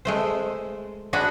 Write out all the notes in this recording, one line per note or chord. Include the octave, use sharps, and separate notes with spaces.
G#3 A3 C5
D4 F#4 G#4 B5